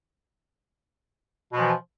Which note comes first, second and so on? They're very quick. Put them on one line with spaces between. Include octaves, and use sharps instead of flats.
B2 F3 E3